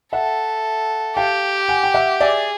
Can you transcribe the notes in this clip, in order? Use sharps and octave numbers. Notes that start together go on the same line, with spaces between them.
A4 E5 F#5
G4 F5 G5
F#5 G#5
G5
E5 F#5
G#4 D5 E5